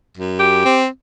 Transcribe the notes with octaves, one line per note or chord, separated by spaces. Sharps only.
F#2
G4
C4